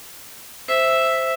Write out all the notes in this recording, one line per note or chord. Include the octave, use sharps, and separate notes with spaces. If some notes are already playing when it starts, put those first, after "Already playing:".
C5 E5